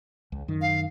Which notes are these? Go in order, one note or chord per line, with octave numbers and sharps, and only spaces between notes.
C#2
F#2 D#3
F5